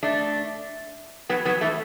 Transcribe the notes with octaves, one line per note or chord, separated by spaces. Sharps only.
A3 D4
F#3 B3
F#3 B3
E3 A3